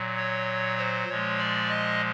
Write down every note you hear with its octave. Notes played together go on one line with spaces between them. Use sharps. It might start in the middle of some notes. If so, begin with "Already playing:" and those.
Already playing: A#2 F#3
C#5
C5
A#2 F3 G#3 C#5
D5
D#5